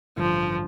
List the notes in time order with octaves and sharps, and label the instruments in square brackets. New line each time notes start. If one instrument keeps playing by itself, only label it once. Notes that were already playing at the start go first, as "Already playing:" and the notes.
[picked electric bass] A1 G2 D3 [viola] F3